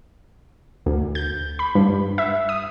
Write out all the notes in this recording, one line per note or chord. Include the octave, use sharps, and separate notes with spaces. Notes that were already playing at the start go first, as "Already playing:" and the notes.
D2
G6
B5
G2
E5
D#6